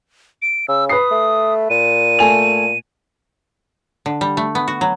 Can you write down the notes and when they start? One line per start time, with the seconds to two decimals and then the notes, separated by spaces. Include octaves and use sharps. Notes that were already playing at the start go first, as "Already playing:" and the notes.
0.42 D7
0.68 C#3 E6
0.89 B4 D#6 C7
1.11 A3
1.70 A#2 D#7
2.19 A3 G#5 F7
4.06 D3
4.21 G3
4.37 A3
4.55 B3
4.68 F#4
4.81 F#3